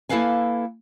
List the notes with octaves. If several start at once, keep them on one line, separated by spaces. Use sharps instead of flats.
A#3 E4 A4 B4 F5 G#5